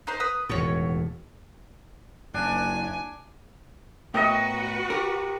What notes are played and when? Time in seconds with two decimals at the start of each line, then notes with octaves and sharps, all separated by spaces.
0.07 D#4 B4 C5
0.20 B4 D#6
0.49 E1 D#2 A2 F#4 C#5
2.34 F#1 D4 G#5
4.14 A2 B3 F#4 A#4 B4 D#5 G5
4.90 G4 A#4